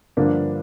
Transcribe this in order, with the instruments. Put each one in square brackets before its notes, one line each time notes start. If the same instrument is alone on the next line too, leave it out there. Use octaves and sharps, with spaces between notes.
[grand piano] G2 D3 F3 A#3 D4